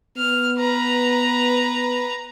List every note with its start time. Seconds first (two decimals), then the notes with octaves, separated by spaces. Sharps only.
0.17 B3 F6
0.59 B4 A#5